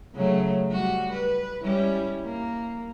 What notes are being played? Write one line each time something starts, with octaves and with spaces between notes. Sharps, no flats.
C#3 F#3 A3
G3 F#4
B4
G3 C#4 E4
A#3